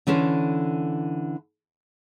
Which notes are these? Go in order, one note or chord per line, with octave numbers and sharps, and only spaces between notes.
D3 E3 C#4 A4 C5